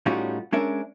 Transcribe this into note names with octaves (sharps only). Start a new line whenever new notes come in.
A2 G3 C#4 D#4 F4 F#4
G#3 C#4 D4 A#4 E5